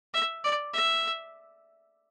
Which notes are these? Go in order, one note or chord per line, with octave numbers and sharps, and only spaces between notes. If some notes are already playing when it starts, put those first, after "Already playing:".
E5
D5
E5